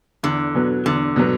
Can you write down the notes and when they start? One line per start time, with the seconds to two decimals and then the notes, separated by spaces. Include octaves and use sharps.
0.23 E2 D3
0.55 B2 F#3 B3
0.85 E2 D3
1.16 B2 F#3 B3